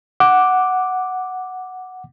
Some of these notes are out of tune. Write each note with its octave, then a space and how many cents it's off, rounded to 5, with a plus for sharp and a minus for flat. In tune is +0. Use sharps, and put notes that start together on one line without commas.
F#5 +0 D6 +0